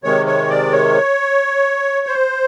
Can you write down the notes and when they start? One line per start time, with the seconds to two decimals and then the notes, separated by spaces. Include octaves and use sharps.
0.04 C3 D#3 G#3 C#5
0.26 C#5
0.49 D5
0.72 C#5
2.07 C5